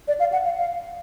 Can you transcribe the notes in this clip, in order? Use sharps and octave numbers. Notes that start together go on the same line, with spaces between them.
D5
F5
F#5
F5
F5